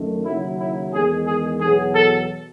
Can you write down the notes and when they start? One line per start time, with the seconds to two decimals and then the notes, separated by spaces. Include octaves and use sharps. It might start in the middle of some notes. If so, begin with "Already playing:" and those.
Already playing: F#2 D#3 A3
0.25 D#2 C#3 F#3 E4
0.60 E4
0.93 E2 D#3 G#3 G#4
1.27 G#4
1.61 E2 B2 F#3 G#4
1.95 A4